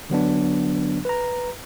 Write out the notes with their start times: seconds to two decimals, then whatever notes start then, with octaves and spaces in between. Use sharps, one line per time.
0.10 D3 F#3 B3 D4
1.05 B4 A#5